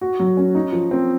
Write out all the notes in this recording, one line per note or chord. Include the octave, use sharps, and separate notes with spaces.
F#4
F#3
C#4
D#4
F3
C4